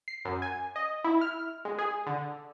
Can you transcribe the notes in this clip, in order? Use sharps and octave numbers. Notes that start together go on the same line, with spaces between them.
C7
F#2
G#5
D#5
E4
F6
G#3
G#4
D3